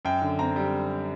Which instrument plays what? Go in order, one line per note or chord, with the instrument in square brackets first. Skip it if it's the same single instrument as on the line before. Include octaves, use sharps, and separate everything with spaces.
[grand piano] F#2 G5
D3
C4 A#5
G3